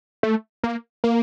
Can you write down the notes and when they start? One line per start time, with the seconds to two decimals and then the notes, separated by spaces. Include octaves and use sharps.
0.23 A3
0.63 A#3
1.04 A#3